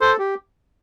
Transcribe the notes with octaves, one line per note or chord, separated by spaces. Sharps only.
A4 C5
G4